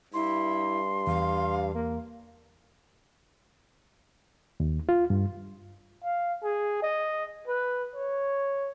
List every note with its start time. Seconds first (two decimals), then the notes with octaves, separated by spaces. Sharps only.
0.14 G2 E4 C6
1.07 E2 F5
1.75 A#3
4.60 D#2
4.89 F4
5.10 G2
6.03 F5
6.43 G#4
6.82 D#5
7.48 B4
7.95 C#5